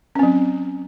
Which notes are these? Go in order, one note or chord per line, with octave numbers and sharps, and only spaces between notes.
F#3 C4 C#4